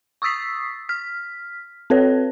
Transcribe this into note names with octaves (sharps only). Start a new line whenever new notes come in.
C#6 D#6 E6 A6 B6 C7
F6 B6
C4 A4 B4 C#5